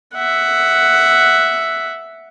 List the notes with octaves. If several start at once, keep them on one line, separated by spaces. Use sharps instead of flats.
E5 F#5